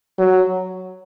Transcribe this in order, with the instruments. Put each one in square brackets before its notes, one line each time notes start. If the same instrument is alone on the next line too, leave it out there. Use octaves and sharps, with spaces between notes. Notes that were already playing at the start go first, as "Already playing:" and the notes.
[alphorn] F#3